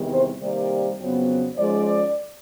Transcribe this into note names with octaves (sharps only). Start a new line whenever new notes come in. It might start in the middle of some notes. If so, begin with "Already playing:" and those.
Already playing: E2 C3 D#3 G3
C5
C3 D#3 G3 A#3 D5
F2 C#3 F#3 B3
G#2 F3 G#3 C#4 D5